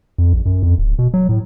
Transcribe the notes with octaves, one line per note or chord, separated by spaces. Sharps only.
F2
A#1
F#2
F2
D1
B2
F#3
A2